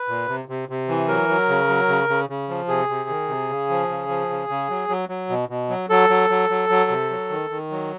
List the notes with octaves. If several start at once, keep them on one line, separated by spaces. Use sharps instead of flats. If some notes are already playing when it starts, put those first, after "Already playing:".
Already playing: B4
A#2
C3
C3
C3
E3
F#3 A#4
F#3
C#3
F#3
C#3
C#3
C#3
F3
C3 G#4
C3
D#3
C3
C#3
F3
C#3
F3
C#3
C#3
F#3
F#3
F#3
B2
B2
F#3
F#3 A4
F#3
F#3
F#3
F#3
C3
F#3
D#3
D#3
F#3